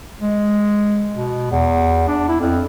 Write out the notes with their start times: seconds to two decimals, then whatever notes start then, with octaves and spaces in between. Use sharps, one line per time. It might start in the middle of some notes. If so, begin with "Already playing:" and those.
0.21 G#3
1.14 B2
1.51 E2
2.08 D4
2.28 E4
2.40 F2